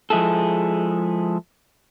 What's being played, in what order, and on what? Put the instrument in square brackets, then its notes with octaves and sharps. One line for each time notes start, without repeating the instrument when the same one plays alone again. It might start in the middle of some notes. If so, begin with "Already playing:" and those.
[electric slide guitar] F3 G#3 E4 G#4 A4